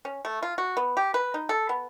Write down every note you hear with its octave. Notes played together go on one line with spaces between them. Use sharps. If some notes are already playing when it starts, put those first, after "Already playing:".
C#4
A3
F4
F#4
B3
G4
B4
D#4
A4
B3